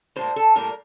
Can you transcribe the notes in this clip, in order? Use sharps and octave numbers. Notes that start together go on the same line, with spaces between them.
A2 G3 A#3 C5
A4
A2 G3 A#3 A#4